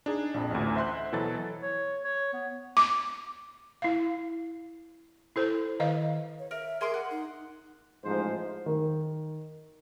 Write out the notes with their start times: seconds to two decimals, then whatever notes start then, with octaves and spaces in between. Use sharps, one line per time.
0.06 D4 D#4 G#4
0.34 A#1 F2
0.51 A1 D2
0.75 C5 E5 C6 F#6
1.12 B2 E3 F#3 A4 A6
1.62 C#5
2.04 C#5
2.33 B3
2.77 D6
3.82 E4 F5
5.36 E4 A4 C5
5.80 D#3 D#5 F5
6.39 C#5
6.51 A#4 E5
6.81 G#4 A#4 C6 D6
6.94 F#5
7.11 D#4
8.04 A1 G#2 F3 C5
8.66 D#3